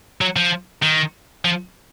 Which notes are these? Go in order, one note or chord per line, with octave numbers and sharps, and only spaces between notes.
F#3
F3
D#3
F3